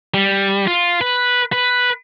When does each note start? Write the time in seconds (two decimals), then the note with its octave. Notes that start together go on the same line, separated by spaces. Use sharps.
0.14 G3
0.67 F4
1.01 B4
1.52 B4